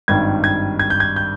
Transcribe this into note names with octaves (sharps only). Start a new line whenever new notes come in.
G#1 G2 D#3 G3 G#6
G#6
G#6
G6
G#6
G6